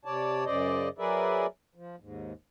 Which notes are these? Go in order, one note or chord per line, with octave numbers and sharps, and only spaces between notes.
C3 C#5 D5 A5
F#2 C#3 C5 D5 D#5
F#3 G#4 A#4 B4 D5 E5
F3
D#2 G#2